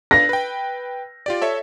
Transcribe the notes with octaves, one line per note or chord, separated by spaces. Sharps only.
D4 B4 F5 A#6
B4 G5
F4 G4 D5
A4 C#5 E5